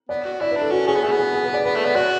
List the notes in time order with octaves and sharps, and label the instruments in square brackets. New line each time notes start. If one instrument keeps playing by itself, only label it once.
[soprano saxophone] B3 [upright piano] D5
[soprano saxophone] F#4
[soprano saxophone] E4 [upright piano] D5
[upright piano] B4
[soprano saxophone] D4 [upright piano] A4
[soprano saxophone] C#4 [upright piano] F#4
[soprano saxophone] C#4 [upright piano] G#4
[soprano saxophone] B3
[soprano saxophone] A3 [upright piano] G#4
[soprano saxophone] B3
[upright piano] G#4
G#4
B4
D5
[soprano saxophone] B3 [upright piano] B4
[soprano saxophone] A3
[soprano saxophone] B3 [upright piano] D5
[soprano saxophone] F#4 [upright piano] D5